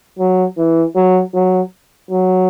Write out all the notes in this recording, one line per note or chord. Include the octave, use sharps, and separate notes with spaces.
F#3
E3
F#3
F#3
F#3